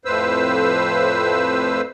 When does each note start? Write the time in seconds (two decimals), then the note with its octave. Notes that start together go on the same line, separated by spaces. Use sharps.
0.05 F2 A2 B4 C5 E6